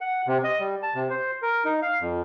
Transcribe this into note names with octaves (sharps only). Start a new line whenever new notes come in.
F#5
C3
D#5
G3
A5
C3
C5
A#4
D#4
F5
F2